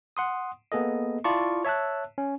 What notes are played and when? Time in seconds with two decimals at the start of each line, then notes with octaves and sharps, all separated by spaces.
0.17 F#5 C6 D#6
0.72 A#3 B3 G#4 A4 D#5
1.24 E4 F4 D5 A5 C#6
1.64 C#5 E5 A5 E6 F#6
2.18 C#4